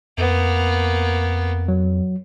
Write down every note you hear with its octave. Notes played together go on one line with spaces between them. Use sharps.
F2 A#3 B3
F#3